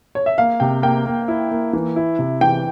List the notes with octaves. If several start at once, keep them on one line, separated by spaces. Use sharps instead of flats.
C#5
E5
A#3 F5
C3 G5
A#3 G5
A#3
E4
A#3
E3
E4
C3
E3 G5